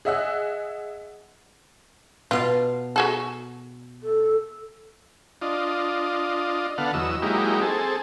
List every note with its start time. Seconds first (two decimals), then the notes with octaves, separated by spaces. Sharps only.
0.05 G#4 D#5 E5 F#5 E6 F#6
2.31 B2 F4 F5 A5
2.96 F#4 G#4 A4
4.03 A4
5.42 D4 F4 D#5
6.78 D3 B3 A4 F5 F#5
6.94 E2 F#3 D#5 E6
7.22 F#3 G#3 A#3 D#4 E4 G4
7.61 C4 G#4 A4